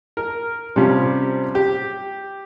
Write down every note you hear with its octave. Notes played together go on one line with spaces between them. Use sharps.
A#4
C3 F3 G3 C#4
G4